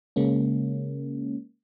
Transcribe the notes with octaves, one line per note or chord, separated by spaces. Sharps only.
C#3 G#3 A#3 C#4